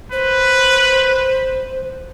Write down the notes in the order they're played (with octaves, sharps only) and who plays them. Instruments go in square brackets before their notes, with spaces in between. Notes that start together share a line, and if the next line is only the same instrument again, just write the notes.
[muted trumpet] B4 [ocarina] C5